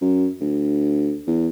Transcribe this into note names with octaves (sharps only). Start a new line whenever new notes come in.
F#2
D2
E2